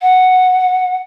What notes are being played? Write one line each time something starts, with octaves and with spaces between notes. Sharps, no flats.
F#5